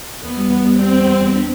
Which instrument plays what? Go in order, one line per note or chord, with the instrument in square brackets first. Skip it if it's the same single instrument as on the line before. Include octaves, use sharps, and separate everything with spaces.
[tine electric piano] E2 [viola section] B3
[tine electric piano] G3
E2
G3
[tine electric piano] G3 [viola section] C4
[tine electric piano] E2
E2
E2
D4